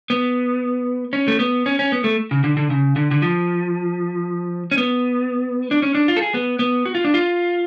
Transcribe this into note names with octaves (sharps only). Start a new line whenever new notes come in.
B3
C#4
A3
B3
C#4
C#4
B3
A3
C#3
D3
D3
C#3
D3
D3
F3
C#4
B3
D4
C#4
D4
F4
A4
G#4
B3
B3
F#4
F4
D4
F4